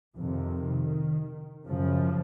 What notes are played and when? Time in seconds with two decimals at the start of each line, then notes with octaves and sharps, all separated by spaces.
0.18 F2 C3 D#3
1.67 F#2 C#3 F3